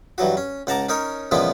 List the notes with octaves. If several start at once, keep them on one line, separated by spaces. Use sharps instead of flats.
G2 E3 F#3 F#4
C#4
C#2 F#5 A5 A#5 D6
C#4 D#4 A#4 C#5
A#2 C#3 E3 F3 G#3 B3